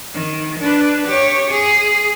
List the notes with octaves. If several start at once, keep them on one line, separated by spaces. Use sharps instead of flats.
D#3
D4 B4
G4 C#5
G#4